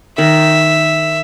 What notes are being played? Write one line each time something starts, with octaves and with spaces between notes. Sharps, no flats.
D#3 E5